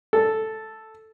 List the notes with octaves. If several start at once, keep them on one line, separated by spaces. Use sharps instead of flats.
A4